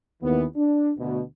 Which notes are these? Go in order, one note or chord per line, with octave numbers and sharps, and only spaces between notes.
D#2 E3 B3
D4
D2 B2